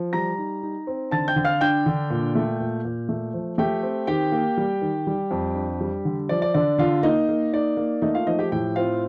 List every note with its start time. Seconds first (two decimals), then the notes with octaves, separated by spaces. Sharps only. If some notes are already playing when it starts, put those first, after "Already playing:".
Already playing: F3
0.13 G3 A#5 A#6
0.38 D#4
0.63 D#4
0.87 C4
1.11 D3 A5 A6
1.28 G5 G6
1.36 D3
1.45 F5 F6
1.61 D4 G5 G6
1.86 D3
2.10 A#2
2.35 A3
2.60 A#2
2.85 A#2
3.09 A3
3.34 F3
3.58 A3 G4 G5
3.83 C4
4.07 D#3 G4 G5
4.32 A#3
4.57 G3
4.82 D#3
5.07 G3
5.31 F2
5.55 D4
5.81 G3
6.05 D3
6.29 F3 D5
6.42 D5
6.54 D3 D5
6.78 D3 F4 F5
7.03 A#3 D#4 D#5
7.29 A#3
7.53 D#4 D5
7.77 A#3
8.02 A3 D#4 D#5
8.14 F4 F5
8.26 F3 D#4 D#5
8.39 G4 G5
8.52 A2 G4 G5
8.76 C4 F4 F5